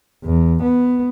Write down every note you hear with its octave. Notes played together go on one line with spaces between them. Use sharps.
E2
B3